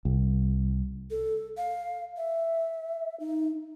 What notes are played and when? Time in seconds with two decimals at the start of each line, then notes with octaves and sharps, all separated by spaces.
0.05 C2
1.11 A4
1.57 F5
2.17 E5
3.20 D#4